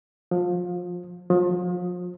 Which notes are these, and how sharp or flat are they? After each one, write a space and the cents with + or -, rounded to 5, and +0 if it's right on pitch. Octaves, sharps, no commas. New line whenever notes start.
F3 +25
F3 +35